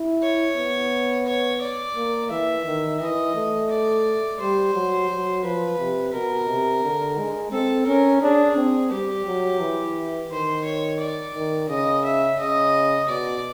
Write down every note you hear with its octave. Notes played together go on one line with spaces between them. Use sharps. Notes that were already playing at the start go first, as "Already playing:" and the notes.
Already playing: E4
C#5
B3
C#5
D5
A#3
E3 E5
D#3
E3 D#5
A3
D5
G3 C5
F#3
F#3
F3 B4
C3
B2 A#4
C3
D3
G#3
C4 A4
C#4 A#4
D4 G#4
C4
G3 G4
F#3
E3
D#3 C5
C#5
D5
D#3
C#3 D#5
E5
C#3 D#5
B2 D5